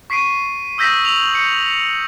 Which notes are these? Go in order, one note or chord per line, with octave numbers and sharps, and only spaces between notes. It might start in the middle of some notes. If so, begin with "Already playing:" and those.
C#6 B6 C7 D7 D#7
D#6 E6 G6 A#6 B6 E7
E6 F7 F#7
C#7